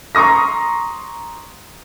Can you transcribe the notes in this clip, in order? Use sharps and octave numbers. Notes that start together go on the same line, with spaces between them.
A#5 C6 C#6 D#6 A#6